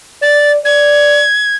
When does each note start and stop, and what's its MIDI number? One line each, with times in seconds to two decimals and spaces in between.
0.22 0.57 74
0.22 0.52 93
0.65 1.23 74
0.65 1.56 92